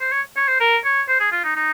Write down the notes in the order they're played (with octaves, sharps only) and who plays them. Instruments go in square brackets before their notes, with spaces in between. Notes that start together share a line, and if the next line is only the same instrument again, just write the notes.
[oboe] C5
C#5
C#5
C5
A#4
C#5
C5
G#4
F4
D#4
D#4